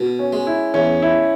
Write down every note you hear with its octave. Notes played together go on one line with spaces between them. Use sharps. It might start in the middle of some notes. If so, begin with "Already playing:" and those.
Already playing: B2
C#4
G#3
E4
E2 C#4
E4